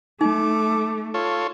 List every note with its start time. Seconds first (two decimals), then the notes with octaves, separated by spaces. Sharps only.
0.21 A3 D#4 D6
1.14 F4 A4 C#5